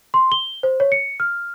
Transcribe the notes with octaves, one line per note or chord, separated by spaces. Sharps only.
C6
G7
C5
C#5
C#7
F6